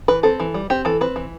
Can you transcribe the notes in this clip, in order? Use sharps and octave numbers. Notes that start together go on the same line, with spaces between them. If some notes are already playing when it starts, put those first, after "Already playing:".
E3 B4
C4 A4
E3
G3
C4 G4
E3 A4
C4 B4
E3